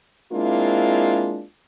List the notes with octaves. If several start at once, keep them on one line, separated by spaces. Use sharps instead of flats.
G#3 A#3 C4 D4 E4 F4